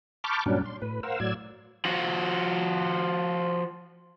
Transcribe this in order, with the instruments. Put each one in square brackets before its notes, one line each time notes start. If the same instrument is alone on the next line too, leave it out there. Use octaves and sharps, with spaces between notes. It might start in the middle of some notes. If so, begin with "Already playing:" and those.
[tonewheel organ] A5 B5 C#6 D6 F6 G6
G2 A#2 F#3 C#4 D4
C6
A2 B4
A#4 C5 F5 F#5 E6
A2 F#3 D5 E6 G#6
[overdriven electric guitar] F3 F#4